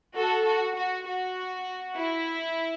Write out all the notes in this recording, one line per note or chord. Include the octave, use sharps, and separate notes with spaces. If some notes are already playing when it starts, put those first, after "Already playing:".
F#4 A4
F#4
F#4
F#4
E4